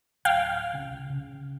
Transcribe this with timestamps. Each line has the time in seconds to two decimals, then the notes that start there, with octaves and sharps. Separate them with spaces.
0.25 D1 F5 G5
0.73 C2 C#3
1.10 C#3